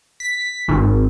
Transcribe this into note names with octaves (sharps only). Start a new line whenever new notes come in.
B6
G#1